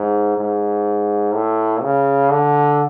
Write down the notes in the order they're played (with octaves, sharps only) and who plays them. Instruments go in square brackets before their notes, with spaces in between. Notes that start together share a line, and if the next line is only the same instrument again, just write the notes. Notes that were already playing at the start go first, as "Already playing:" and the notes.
Already playing: [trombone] G#2
G#2
A2
C#3
D3